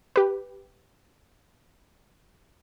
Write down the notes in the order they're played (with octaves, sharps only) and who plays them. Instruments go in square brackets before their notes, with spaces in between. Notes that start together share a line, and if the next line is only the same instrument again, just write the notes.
[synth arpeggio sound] G4 B4